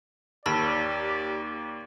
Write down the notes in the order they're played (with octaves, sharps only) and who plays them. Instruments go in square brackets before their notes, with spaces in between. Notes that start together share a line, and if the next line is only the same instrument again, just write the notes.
[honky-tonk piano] D#2 [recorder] G4 [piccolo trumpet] D5 [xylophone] A5 B5 E6